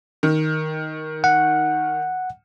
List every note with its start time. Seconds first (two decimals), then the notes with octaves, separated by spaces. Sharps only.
0.23 D#3
1.24 F#5